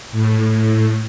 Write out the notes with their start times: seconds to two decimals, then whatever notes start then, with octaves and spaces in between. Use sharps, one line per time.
0.12 A2